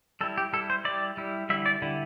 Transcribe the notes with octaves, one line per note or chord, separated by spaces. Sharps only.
G3 E4 A4
G4
G3 E4 A4
C5
G3 E4 D5
G3 E4
D3 G3 E4 E5
D5
D3 G3 E4